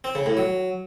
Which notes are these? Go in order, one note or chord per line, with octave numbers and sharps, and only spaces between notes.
C4
C#3
A2
F#3